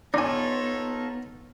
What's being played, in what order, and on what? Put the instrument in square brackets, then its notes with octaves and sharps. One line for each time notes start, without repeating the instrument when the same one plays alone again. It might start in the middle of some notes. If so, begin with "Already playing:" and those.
[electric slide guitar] B3 [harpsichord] D4 G#5 [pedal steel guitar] D#4 F4 A4 [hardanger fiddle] C#5